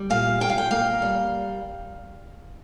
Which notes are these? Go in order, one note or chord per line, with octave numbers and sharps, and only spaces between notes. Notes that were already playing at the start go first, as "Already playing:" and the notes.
Already playing: G3
A#2 F5
A#2 G5
F5
G5
A#3 F5
G3